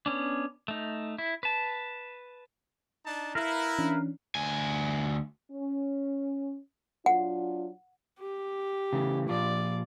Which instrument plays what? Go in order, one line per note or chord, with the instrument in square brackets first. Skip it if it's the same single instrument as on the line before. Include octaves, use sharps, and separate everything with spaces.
[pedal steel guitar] B3 C#4 D4
A3 D#4
E4
B4 A5
[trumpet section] D4 D#4 A5
[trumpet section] E4 [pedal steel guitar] A#4 B4 F5
[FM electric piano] E3 C#4 D4
[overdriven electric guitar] D2 G#5
[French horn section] C#4
[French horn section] F#3 D4 F4 [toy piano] F#5
[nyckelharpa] G4
[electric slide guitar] C#3 E3 A3
[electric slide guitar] A#2 F3 F4 [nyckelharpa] D5